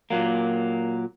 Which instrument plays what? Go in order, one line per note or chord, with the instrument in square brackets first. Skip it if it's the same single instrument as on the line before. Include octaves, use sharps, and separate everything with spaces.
[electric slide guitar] A#2 F#3 A#3